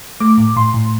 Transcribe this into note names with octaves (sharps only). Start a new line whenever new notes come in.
A3 D6
A2
A2 C6
A2